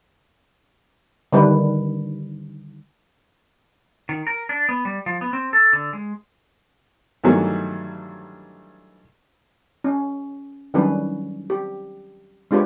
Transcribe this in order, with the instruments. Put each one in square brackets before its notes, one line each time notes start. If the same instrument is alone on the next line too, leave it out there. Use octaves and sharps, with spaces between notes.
[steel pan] D3 D#3 G3 D4 B4
[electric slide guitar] D#3
A#4
D4
B3
G3
F3
B3
C4
A4
D3
G#3
[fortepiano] G2 D#3 E3 F#3 A3
[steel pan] C#4
D#3 F#3 G3 C#4 D4 B4
G4
G#3 D4 F4 G4 B4 C#5